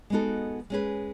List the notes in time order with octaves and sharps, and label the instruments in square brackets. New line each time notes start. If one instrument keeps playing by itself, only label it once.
[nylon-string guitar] G#3 B3 D#4 F#4 A4
G#3 C#4 G#4 B4